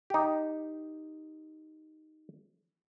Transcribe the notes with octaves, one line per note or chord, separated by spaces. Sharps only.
D#4 G4